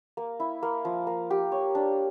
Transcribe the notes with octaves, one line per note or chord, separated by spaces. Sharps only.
A#3
E4
A#3
F3
A#3
G4
C#5
D4